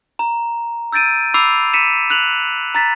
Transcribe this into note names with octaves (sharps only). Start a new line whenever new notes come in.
A#5
E6 G6 A6 D7 D#7
B5 D6 E6 C7 F7
B6 C#7 D#7 E7
F#6 F7 F#7
A#5 A6 B6